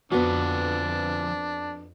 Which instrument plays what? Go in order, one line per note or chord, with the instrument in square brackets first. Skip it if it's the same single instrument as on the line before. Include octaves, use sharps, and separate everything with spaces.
[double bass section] F2 [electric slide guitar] F3 B4 [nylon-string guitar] B3 F#4 [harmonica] D4